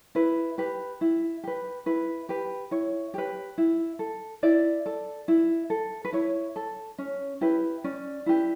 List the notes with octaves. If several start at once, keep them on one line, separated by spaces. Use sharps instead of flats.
E4 B4
G4 B4
E4
G4 B4
E4 B4
G4 B4
E4 C#5
G4 B4
E4
A4
E4 D5
A4
E4
A4
B4
E4 C#5
A4
C#4
E4 G4 B4
C#4 D5
E4 G4 B4